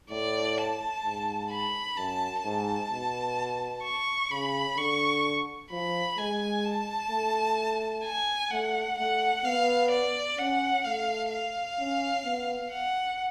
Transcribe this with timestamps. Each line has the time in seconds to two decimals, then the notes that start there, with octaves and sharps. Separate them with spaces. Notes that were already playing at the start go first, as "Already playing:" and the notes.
0.10 A2 D5
0.58 A5
1.05 G#2
1.51 B5
1.97 F#2 A5
2.44 G#2 A5
2.91 B2
3.84 C#6
4.31 C#3 B5
4.77 D3 C#6
5.71 F3 B5
6.18 G#3 G#5
6.65 A5
7.11 A3
8.04 G#5
8.51 A3 F#5
8.99 A3 F#5
9.45 B3 F5
9.91 D5
10.39 C#4 F#5
10.85 A3 F5
11.31 F5
11.79 C#4
12.25 B3
12.72 F#5